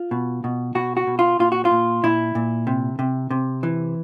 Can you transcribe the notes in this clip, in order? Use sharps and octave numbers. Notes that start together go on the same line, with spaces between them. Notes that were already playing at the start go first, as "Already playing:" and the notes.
Already playing: F4
B2
B2
B2 F#4
F#4
B2
F4
A#2 F4
F#4
F4
A#2
A#2 E4
A#2
C3
C3
C3
E3